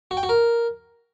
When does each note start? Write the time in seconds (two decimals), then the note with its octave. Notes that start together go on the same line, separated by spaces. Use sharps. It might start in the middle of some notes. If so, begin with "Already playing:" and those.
0.11 F#4
0.17 G5
0.23 F#4
0.29 A#4